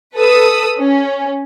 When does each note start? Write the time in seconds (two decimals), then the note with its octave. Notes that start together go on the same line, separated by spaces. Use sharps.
0.17 A4 B4 D#6 E6
0.79 C#4